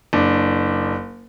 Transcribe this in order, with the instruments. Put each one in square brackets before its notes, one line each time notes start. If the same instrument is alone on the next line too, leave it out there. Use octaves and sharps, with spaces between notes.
[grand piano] F#1 D4